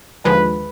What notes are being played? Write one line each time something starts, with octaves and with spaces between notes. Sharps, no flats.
D#2 D3 F3 G#3 B4